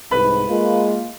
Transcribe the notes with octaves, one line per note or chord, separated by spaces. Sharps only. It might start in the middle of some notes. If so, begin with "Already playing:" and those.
C2 G#2 B4 B5
G#3 A#3 F4